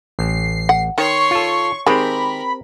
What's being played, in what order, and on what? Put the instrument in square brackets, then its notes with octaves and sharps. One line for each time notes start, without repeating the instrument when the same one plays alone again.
[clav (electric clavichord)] A1 [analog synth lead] C7
[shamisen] F#5
[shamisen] D#3 [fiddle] C#5 C6 [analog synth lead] C#6
[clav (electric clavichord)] F4 A4
[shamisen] D#3 G#3 [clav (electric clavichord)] C4 G4 [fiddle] A#4 [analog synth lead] B5